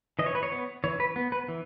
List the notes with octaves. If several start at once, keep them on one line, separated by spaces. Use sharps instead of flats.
E3 D#5
C#5
B4
C#5
B3
E3 C#5
B4
B3
B4
E3